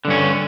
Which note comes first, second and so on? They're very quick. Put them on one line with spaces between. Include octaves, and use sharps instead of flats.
D3 G2 C#4